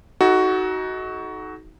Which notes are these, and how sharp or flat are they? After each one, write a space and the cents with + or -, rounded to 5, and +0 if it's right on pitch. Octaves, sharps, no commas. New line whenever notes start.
D#4 +25 F#4 +10 A4 -35